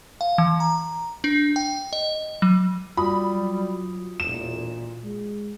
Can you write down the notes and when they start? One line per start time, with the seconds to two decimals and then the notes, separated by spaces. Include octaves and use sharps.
0.21 F5
0.38 E3
0.60 A#5
1.24 D4
1.56 G5
1.93 D#5
2.42 F#3
2.97 G3 F4 F#4 B5 D#6
3.32 F#3
4.20 E1 A#2 E7
5.04 G#3